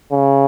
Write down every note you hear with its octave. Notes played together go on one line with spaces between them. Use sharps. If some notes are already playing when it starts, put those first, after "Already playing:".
C#3